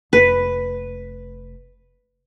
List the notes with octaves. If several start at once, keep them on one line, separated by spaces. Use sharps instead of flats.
F1 B4